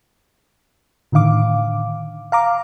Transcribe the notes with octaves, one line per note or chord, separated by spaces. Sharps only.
A2 D3 D#3 F5 D6
F5 A#5 D6